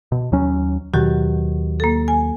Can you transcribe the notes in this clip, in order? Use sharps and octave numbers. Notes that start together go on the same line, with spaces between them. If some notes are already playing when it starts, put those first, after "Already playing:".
B2
D#2 F#3 C#4
D#2 B2 D#3 F#3 F#4 G4
A#3 A4
G#5